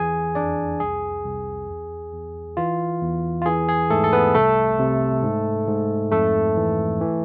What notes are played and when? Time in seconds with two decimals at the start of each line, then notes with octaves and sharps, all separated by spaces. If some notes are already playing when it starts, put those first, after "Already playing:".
Already playing: E2 E3 G#4 G#5
0.35 F2 D4 D5
0.80 C2 G#4
1.24 C2
1.69 E2
2.13 E2
2.57 E3 F4
3.02 E2
3.42 F4
3.46 E3 G#4
3.69 G#4
3.90 G#2 A3 A4
4.04 A4
4.13 B3 B4
4.35 C2 A3 A4
4.79 C3
5.23 G#2
5.68 G#2
6.11 F2 A3 A4
6.57 E3
7.01 E3